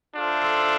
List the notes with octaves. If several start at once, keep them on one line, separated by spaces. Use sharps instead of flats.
D4 F4 A4 C5 E5